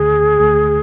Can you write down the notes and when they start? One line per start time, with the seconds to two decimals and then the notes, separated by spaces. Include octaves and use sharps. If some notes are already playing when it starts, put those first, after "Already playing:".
Already playing: D2 D3 A3 G#4
0.40 D2 D3 A3